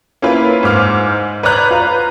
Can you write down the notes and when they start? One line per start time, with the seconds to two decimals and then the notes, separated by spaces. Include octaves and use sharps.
0.22 A#3 C#4 E4 F4 B4
0.63 G#2 C5 D6 F6
1.43 B4 C#5 D5 A#5 F#6 G6
1.71 F4 B4 A#5